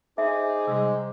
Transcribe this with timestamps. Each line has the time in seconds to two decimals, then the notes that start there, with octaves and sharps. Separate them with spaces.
0.18 D#4 G#4 C5 E5 D6
0.67 C3 G3 G#3